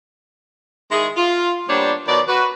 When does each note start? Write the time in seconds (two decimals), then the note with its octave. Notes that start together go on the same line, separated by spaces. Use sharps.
0.91 D#3 G#3 E4 G#4
1.17 F4
1.69 A#2 G3 B3 D4 C5 C#5
2.08 B2 D#3 F#3 D5
2.28 F#4 B4